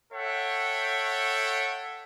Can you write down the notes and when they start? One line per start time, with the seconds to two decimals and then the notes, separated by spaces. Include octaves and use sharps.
0.13 A4 C#5 E5 F#5 G5